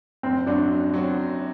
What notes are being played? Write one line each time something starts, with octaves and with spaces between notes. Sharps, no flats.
F#1 C4
F#2 F#3 C4 D4 F#4
F#1
F#3 C4 F#4